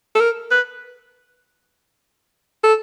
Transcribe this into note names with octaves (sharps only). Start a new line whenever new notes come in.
A4
A#4
B4
A4